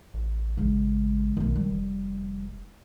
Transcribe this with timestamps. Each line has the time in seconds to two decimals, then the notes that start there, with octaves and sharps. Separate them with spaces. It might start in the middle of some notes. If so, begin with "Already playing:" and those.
0.14 A1
0.57 C#3 G#3
1.37 B1 D#3 A3
1.56 G3
1.71 F1